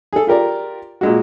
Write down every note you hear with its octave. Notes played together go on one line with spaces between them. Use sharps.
G#4 A4
F4 G4 A#4 D5
A#2 G#3 F#4